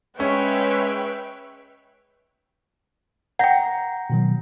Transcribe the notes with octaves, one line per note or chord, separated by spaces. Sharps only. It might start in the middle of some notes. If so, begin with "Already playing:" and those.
G#3 C#4 B4 C#5 E5 G5
F#5 G5 A#5 G6 A#6
B2 D#3 F#3